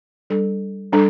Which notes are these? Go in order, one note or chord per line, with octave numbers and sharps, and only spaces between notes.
G3 D4 A4
G3 D4 A4